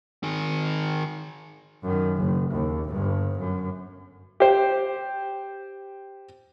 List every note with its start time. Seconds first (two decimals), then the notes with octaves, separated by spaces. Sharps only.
0.23 D#3 G#4
1.83 F#2 D#3
2.17 F#1
2.51 D#2
2.89 G1 G2
3.39 F#2
4.40 G4 C5